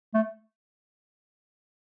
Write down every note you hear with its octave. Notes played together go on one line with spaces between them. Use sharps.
A3